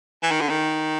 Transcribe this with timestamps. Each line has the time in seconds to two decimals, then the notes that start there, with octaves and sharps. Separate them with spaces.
0.23 E3
0.31 D#3
0.41 D3
0.49 D#3